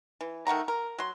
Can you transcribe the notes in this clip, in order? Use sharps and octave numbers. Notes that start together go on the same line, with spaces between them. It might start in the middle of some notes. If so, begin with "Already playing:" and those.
E3
D#3 A3 F#5 A#5
A#4
F#3 C6